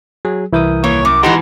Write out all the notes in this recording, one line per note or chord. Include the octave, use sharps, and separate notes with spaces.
F#3 G#4
C2 E3 E4 A#4 D#6 G6
D#2 E3 A#3 C#5
F#2 D6
G#2 B2 E3 D#4 G4 F#5 A#5 C6